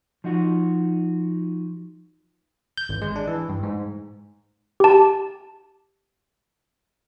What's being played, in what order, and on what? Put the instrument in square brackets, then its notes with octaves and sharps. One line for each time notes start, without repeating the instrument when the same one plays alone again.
[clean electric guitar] F3 D#4 F#4
[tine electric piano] G6
G#1
G#3
D4
E3
G2
G#2
[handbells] G4 A5